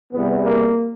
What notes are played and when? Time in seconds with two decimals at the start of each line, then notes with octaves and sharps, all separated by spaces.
0.13 E2 C3 E3 G3 B3
0.45 A#3